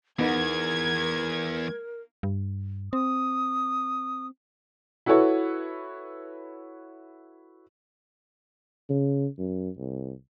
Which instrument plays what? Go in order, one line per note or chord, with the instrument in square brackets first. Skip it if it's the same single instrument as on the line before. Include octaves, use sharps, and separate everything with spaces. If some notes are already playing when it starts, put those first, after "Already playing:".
[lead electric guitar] E2 [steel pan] B3 D#4 [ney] A#4 [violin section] G#6
[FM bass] G2
[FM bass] C4 [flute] D#6
[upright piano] E4 F#4 A4 B4 C#5
[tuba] C#3
F#2
C2